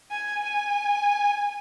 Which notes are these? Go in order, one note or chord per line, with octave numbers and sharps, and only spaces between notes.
G#5
G#5